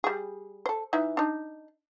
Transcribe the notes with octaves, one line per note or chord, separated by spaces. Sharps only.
G3 G#4
A4 C5
E3 D#4 E5
D4 D#4